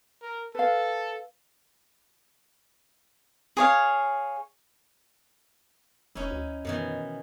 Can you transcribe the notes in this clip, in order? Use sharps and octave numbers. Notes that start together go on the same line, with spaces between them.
A#4
A4 B4 F5
G#4 C#5 F5
F1 C#4 D#4 E4
D2
F#2 B2 D#3 E3